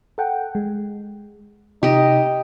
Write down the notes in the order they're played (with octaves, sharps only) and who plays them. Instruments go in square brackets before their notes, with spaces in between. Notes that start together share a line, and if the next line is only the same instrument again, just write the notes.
[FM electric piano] A4 F#5 G5
G#3
[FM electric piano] C3 [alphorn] D#4 [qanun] G4 D#5